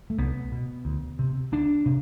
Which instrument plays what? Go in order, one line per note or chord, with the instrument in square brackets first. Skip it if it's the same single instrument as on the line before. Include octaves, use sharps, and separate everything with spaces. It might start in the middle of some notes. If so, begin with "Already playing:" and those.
[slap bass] A3
C2 B3
B2
D2
C3
D2 D4
C3